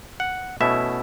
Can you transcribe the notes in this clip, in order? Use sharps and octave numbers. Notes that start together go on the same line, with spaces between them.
F#5
B2 A3 C#4 E4 E5